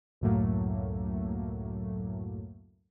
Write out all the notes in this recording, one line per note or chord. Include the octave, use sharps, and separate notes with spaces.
C#2 F#2 A2 F#3 A3 A#3